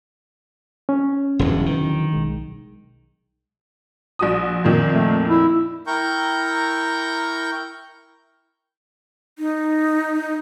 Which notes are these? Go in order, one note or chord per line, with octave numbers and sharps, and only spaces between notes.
C#4
E1 E2 G2 D3 E3 F#3
D#3
B1 G#3
A#1 F#4 D#6
F2 A#2 D#3
A3
E4
E4 A#4 G5 A#5 C#6 G6
D#4